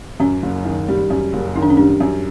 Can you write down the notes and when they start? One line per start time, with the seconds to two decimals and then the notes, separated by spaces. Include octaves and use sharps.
0.20 F#2 C#4
0.42 F#1
0.65 D#3
0.88 G3
1.10 F#2
1.33 F#1
1.55 D#3 D#4
1.63 D4
1.70 C#4
1.77 G3 D4
2.00 F#2